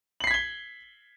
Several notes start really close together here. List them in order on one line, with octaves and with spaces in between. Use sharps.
F#7 C7 B6 G#6 G7